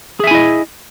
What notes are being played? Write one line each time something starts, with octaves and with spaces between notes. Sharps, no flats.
E4 G#4 D#5 E5 G#5